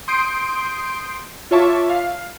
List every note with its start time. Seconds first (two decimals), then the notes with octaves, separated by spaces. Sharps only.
0.08 C6 D#6 G6 C7 D7
1.51 F4 C#5 E5 A5 C#6 D6
1.89 F5